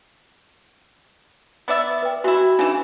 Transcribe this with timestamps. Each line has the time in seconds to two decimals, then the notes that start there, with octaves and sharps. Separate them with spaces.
1.68 B3 D5 E5
2.03 B4 G5
2.24 E3 E4 F#4
2.59 C#3 E3 D4 D#4